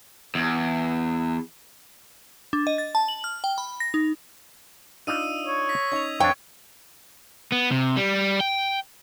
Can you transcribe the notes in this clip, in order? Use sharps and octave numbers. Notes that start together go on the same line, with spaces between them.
E2
D4
D#5
A6
A5
F#7
F6
G5
B5
A#6
D#4
D4 D#4 F4 D#6 E6 D#7
C#5
A#6 B6
C#4 D#4 G#6 F7
F2 D4 C#5 G5
B3
C3
G3
G5